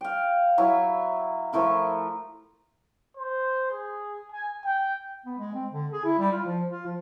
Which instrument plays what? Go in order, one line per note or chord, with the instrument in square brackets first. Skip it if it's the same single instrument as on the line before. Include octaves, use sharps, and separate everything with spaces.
[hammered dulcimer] F5 G5
F#3 E4 E5
F3 A3 E4 A#4
[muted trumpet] C5
G#4
G#5
G5
[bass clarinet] B3
G#3
C4
D3
G#4
E4
G3
F4
F3
F4
F3